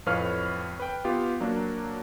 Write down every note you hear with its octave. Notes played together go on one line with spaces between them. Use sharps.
F2 A2 B4 C#5 F5 F6
B4 G5
B3 F4 G4
F#3 A#3 D4